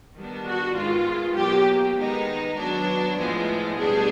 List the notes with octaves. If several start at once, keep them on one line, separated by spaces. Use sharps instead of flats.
D#3 G3 B3 D4
F#4
G#2 D#3 G#3 B3 F4
B2 F#3 A#3 G4
D#3 G#3 B3 D#4
F#3 B3 D4
A2 F3 G#3 B3
B2 G3 B3 D4 G#4